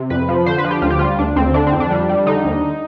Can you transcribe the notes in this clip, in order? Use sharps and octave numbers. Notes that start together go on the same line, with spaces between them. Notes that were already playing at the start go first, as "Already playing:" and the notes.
Already playing: C3
F2 B4
F3
D3 C5
B4
F3
G4
D2 F4
G4
G3 F4
D2 D4
D2 C4
D3 D4
C4
F2
D4
G3
G3
D3 D#4
D#2